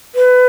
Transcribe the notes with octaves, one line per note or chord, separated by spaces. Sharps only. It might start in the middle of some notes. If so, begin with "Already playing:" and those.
B4